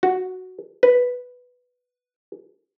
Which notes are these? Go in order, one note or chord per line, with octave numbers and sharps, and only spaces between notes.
F#4
B4